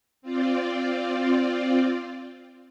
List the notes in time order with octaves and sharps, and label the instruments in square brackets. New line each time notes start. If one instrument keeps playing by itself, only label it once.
[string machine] C4 F4 D5